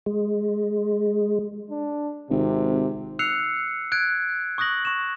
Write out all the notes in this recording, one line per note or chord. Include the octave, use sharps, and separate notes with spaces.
G#3
D4
G#1 C3
E6 F#6 C7 C#7 F7
F#6 G#6 D7
C#6 D#6 F#6 A#6 F#7
C#6 E7